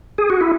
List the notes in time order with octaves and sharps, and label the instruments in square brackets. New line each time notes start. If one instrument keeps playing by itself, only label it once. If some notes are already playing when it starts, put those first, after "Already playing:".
[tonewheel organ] G#4
F#4
E4